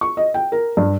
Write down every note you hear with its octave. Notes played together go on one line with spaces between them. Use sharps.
C#6
D#5
G5
A#4
G2